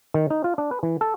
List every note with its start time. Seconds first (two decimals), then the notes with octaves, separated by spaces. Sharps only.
0.14 D#3
0.30 D#4
0.44 F4
0.58 D4
0.71 B4
0.83 E3
1.01 A4